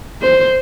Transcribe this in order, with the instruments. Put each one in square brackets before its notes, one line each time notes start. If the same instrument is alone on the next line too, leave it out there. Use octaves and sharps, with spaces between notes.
[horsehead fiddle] C5